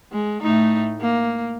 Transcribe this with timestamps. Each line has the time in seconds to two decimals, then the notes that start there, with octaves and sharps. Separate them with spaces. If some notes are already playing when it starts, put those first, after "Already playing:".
0.12 G#3
0.42 A2 A3 D#4
1.01 A#3